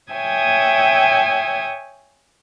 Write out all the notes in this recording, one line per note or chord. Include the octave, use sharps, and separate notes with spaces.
C#5 E5 G5 G#5 D#6 G#6